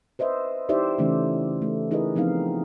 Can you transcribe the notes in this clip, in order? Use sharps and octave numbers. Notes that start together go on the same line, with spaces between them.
B4 C5 D#5 E5
D#4 E4 G4 C5 D5 E5
C#3 E3 A3 C#4 D#4
A3
D#4 E4 G#4 A#4 B4 D#5
F3 B3 C4 D#4 F5